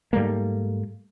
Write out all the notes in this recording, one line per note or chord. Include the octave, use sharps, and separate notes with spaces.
G#2 G3 A3 A#3